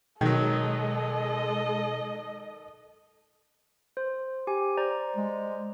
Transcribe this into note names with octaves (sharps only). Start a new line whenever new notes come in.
B2 D#3 F#3 G#3 A4 D#5
C5
G4 G#5
C5 D5 A#5
G#3